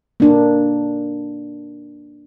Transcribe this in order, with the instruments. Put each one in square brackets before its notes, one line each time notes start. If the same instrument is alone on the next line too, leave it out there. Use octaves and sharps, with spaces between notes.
[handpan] A#3 D4